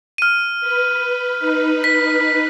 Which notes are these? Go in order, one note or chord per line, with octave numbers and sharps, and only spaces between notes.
F6 D#7
B4
D#4 B4
B6